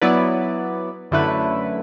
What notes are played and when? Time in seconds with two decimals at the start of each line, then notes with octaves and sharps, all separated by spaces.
0.02 F#3 B3 E4 B4 D5
1.11 F#2 D3 A3 E4 B4